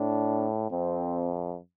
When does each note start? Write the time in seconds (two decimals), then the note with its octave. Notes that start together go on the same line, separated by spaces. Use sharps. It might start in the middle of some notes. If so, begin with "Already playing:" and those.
Already playing: A2 D4
0.71 F2 C4